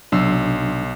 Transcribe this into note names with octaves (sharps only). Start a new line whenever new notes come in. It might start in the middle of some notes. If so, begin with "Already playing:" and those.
B1 C3 F#3 D4 E6 C7